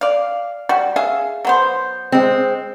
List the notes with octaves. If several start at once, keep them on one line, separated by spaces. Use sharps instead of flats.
D5 F5
G3 F#4
G#4 E5 F5
F#3 B3 C5
G#3 C4